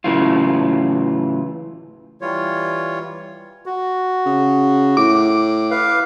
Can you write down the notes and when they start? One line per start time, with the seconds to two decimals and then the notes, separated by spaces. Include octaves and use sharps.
0.04 A2 C#3 E3 F#3 F4
2.21 E3 G3 F4 C#5
3.66 F#4
4.26 C#3
4.97 A2 D6
5.71 B4 F5